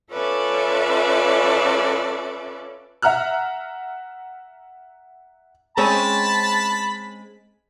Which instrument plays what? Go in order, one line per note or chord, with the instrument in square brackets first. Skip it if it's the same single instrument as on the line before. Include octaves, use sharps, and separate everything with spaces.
[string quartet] C#4 F4 A4 B4 D5 E5
[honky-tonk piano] E5 F#5 A#5 F6 F#6
[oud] G#3 C4 C#4 [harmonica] A5 B5